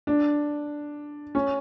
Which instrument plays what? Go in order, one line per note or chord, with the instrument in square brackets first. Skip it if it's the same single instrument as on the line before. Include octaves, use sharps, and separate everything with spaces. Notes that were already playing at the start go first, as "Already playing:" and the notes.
[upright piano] D4
C#4